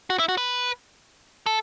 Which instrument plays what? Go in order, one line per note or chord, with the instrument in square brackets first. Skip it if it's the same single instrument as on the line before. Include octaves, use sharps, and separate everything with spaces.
[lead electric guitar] F#4
E4
F#4
B4
A4